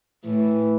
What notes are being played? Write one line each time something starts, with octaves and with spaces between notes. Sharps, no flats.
A2 E3